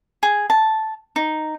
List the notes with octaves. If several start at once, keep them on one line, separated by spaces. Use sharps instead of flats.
G#4
A5
D#4